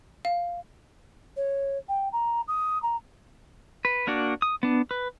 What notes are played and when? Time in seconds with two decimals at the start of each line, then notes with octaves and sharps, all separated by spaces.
0.25 F5
1.37 C#5
1.89 G5
2.13 A#5
2.48 D#6
2.83 A#5
3.85 B4
4.07 A#3 D4 F#4 D5
4.42 D#6
4.63 B3 D4
4.91 B4